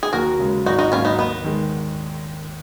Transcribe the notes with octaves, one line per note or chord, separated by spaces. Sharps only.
G#4
D#2 F#4 A#4
C#3 G#3
G#1 D#4 F#4
D#4 F#4
G#2 F#3 A#3 C#4 F4
B3 D#4
D#2 B3
D#3 G#3